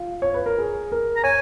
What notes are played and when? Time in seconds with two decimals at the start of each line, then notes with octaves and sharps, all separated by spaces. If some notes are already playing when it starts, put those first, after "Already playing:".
Already playing: F4
0.22 C#5
0.34 B4
0.46 A#4
0.58 G#4
0.92 A#4
1.16 A#5
1.24 C#5 G#5